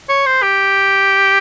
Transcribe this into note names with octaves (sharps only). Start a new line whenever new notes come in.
C#5
C5
G4